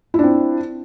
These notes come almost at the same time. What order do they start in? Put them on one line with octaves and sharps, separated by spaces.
E4 D4 C4